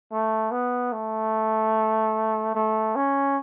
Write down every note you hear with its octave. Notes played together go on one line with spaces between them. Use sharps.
A3
B3
A3
A3
C#4